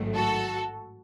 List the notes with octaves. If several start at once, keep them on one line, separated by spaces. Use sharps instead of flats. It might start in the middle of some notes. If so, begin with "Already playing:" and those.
Already playing: A1 G#2 D#3 F#3 A3
F#4 A4